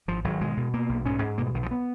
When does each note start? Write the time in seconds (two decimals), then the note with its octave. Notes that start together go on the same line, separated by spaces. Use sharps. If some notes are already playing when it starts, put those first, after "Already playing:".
0.08 G#1 F3
0.24 G#1 F#3
0.41 B2 G#3
0.57 B2
0.73 B2 A#3
0.89 B1
1.06 G#2 C#4
1.23 G#2
1.38 B2 A#3
1.47 G#3
1.54 B1 D#3
1.63 F3
1.71 B3